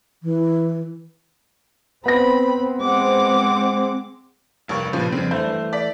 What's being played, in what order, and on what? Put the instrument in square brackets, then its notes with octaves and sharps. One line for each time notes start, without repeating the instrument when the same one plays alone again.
[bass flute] E3
[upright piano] B3 A#6 [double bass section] C4 [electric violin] B5
[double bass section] G#3 C4 [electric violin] F#5 D6
[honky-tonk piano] F1 A#3 C#6 [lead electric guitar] G2
[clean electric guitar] A#2 C#3 [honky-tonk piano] F3 B4
[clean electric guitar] F2 C#3 [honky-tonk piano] C4
[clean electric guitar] E3 A3 [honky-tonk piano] C5
[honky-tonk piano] D5 B6